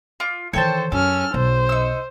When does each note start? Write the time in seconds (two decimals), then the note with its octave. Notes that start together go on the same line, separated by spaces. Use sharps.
0.20 F4 D6
0.53 D#3 E3 A4 C5 C#5 G5 A5
0.92 F#2 C#4 A4 F6
1.34 B1 C5
1.69 D#4 E6